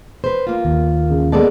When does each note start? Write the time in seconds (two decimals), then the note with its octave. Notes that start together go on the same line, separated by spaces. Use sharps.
0.24 B4 C5
0.47 A#3 F4
0.65 D#2
1.09 C#3
1.32 G#3 A#3 B3 A4 D5 A5